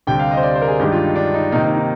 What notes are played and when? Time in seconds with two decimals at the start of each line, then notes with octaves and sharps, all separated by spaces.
0.07 D2 C3 G3 G5
0.19 F5
0.31 D#5
0.37 C5
0.43 D5
0.55 C5
0.62 A#4
0.68 G#4
0.80 G2 D#3 G#3 D4 G4
0.92 F4
1.04 D#4
1.16 D4
1.34 D#4
1.52 C3 D#3 A#3 D#4
1.64 D#4
1.77 D#4